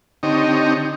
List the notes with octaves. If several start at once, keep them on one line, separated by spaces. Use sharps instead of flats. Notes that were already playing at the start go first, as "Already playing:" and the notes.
D3 C4 D#4 G4 C#5 D#5